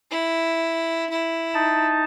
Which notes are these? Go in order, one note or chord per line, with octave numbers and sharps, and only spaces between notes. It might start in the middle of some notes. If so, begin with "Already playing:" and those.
E4
E4
D#4 A5